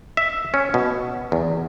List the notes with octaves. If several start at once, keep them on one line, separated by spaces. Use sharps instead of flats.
E5
C#4
B2
E2